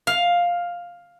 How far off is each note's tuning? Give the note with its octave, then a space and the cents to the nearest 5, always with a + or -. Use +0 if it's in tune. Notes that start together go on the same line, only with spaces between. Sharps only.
F5 +5